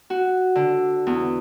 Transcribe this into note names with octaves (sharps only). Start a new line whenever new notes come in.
F#4
D3
E2